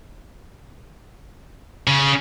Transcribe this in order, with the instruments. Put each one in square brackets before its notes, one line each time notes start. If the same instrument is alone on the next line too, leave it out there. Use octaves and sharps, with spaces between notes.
[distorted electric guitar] C#3